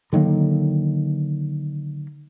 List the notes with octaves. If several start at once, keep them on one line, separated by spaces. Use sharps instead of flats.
D3 D#3 F#3 A#3